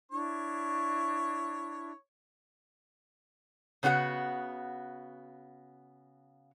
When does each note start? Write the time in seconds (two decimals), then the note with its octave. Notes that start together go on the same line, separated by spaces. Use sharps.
0.11 D4 E4 C#5 C#6
3.83 C#3 B3 F#4 G4 F#5